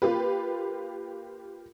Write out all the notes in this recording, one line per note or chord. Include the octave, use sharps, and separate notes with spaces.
A#3 F4 G4 B4